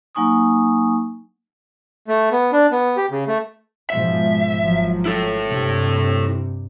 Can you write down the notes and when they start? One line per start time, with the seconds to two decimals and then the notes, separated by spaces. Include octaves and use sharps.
0.15 F#3 A#3 D#4 G#5 C#6 D#6
2.08 A3
2.31 B3
2.52 D4
2.71 B3
2.97 G4
3.11 C#3
3.28 A3
3.90 G#2 B2 F3 E5
4.60 G#1 F3 F#3
5.06 E4 A4
5.48 G2 C3